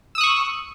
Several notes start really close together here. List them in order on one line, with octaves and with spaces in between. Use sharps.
E6 D#6 F#6 C#6